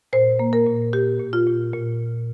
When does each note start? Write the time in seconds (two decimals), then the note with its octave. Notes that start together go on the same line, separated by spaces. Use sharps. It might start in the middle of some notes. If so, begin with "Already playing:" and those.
0.13 A#2 C5
0.39 A#3
0.53 A#4
0.66 A#2
0.93 A#2 G4
1.20 A#2
1.33 F4
1.47 A#2
1.74 A#2